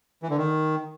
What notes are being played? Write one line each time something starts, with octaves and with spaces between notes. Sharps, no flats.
E3
D3
D#3